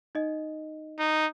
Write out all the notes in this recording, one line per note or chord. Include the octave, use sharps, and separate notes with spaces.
D#4 D#5
D#4